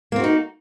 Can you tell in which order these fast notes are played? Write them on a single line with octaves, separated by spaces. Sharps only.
A#3 C4 F#4 D#4